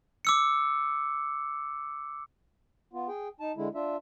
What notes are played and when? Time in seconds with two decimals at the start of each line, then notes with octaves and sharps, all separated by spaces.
0.25 D6 E6 C#7
2.93 B3 F4
3.08 G#4 G5
3.40 D#4 A5
3.56 D3 G#3 E4
3.75 D4 F4 E5